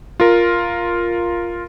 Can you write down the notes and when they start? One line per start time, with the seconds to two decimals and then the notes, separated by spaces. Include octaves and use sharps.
0.20 F4 A#4